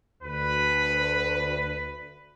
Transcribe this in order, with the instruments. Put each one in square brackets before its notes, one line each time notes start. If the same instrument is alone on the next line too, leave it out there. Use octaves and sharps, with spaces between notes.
[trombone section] D2 [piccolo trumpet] B4